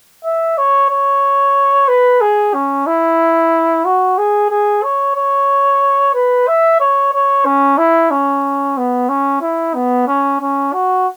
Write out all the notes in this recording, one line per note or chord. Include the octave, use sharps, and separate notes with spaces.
E5
C#5
C#5
B4
G#4
C#4
E4
F#4
G#4
G#4
C#5
C#5
B4
E5
C#5
C#5
C#4
E4
C#4
B3
C#4
E4
B3
C#4
C#4
F#4